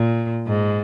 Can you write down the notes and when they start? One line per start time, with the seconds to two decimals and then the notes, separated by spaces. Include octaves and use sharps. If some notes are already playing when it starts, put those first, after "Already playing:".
Already playing: A#2
0.47 G#2